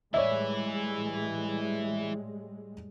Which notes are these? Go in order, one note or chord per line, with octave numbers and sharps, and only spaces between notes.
A2 E3 G3 G#3 E4 C#5 D5 E5